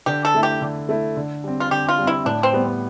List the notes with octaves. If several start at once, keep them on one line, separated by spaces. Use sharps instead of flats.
D3 G4
A4
A3 E4
G4
D3
A3 E4
D3
G3 C4
F4
D3 G4
F4
G3 C4
E4
A2 D4
C4
G3 B3